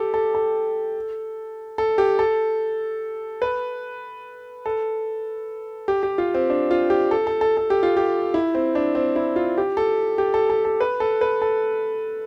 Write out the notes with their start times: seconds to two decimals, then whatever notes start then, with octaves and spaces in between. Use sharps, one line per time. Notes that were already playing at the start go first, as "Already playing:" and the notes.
Already playing: G4 A4
0.14 A4
0.35 A4
1.78 A4
1.98 G4
2.19 A4
3.42 B4
4.66 A4
5.88 G4
6.03 G4
6.18 F4
6.34 C4
6.50 D4
6.71 F4
6.90 G4
7.11 A4
7.27 A4
7.41 A4
7.57 A4
7.70 G4
7.83 F4
7.97 G4
8.34 E4
8.55 C4
8.75 D4
8.95 C4
9.16 E4
9.36 F4
9.58 G4
9.77 A4
10.18 G4
10.34 A4
10.50 A4
10.65 A4
10.81 B4
11.00 A4
11.21 B4
11.42 A4